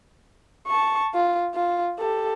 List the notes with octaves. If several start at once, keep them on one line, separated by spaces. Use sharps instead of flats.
A5 C#6
F4
F4
G4 A4